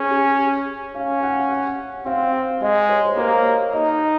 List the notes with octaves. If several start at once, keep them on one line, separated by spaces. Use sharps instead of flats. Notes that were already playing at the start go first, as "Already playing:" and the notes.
Already playing: C#4 G#4
G#4
C#4 F5
F#5
F#5
C4 F5
G#3 D#5
C#5
C5
A#3 C#5
D#4 D#5